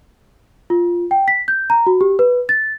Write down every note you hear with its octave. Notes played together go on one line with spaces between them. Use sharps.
F4
G5
B6
G6
A#5
F#4
G4
B4
A6